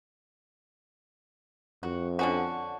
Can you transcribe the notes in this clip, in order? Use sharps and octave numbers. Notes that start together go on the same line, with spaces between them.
F2 F#4
D3 C#4 F#4